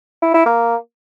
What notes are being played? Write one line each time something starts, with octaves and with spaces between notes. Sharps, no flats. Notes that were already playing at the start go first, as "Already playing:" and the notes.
E4
E4
A#3